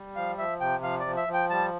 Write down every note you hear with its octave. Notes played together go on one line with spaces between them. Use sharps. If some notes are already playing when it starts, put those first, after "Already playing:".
Already playing: G3
F3 F5
F3 E5
C3 G5
F3 F5
D5
F3
E5
F3
G5
G3 A5